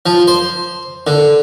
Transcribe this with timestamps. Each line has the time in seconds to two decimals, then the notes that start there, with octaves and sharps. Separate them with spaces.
0.06 F3
0.28 C5
1.07 D3